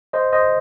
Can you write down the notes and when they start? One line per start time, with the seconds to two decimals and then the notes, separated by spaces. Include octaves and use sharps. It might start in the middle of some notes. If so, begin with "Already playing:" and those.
0.13 C5 D#5
0.33 C5 D#5